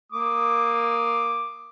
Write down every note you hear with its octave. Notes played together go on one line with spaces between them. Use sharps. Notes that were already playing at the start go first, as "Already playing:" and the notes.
A#3 D6 D#6